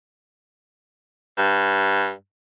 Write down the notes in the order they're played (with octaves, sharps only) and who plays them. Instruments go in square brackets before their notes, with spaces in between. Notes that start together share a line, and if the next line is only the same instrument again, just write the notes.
[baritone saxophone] G2